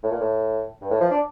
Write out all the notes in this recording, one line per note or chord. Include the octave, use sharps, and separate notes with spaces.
A2
A#2
A2
G2
A2
F3
D4